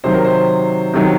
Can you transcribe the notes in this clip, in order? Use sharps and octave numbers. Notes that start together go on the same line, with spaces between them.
C3 D#3 F#3 C5
A#4
C5
C3 D#3 F#3